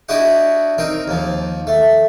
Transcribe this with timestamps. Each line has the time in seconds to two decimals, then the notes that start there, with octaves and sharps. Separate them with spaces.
0.09 D4 E4 F#4 G4 D#5 F#5
0.78 C4 D#4 A#4
1.08 D#2 F3
1.67 A3